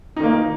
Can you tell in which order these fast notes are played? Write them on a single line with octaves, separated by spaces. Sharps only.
D#4 D#3 A#3